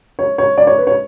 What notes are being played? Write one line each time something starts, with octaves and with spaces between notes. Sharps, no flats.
C#5
C#5
D5
C#5
B4
C#5